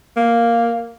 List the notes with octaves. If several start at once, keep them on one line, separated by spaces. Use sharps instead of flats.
A#3